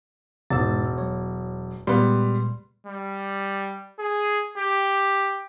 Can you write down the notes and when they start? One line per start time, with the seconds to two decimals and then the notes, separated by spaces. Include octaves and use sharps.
0.50 E1 G#2 E6 A6
0.98 F#3 C#5
1.87 A#2 G3 G#3 B3 C6
2.87 G3
3.99 G#4
4.58 G4